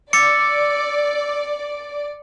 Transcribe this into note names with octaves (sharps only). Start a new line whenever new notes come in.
D5 D6 E6 A6 C#7